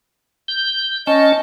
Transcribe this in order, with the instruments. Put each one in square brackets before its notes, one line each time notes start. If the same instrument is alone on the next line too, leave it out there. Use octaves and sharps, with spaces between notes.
[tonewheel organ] G6
[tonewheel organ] C#4 A5 [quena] D#5